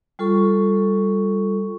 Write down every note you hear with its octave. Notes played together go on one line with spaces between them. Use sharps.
G3 F4 A4 C#6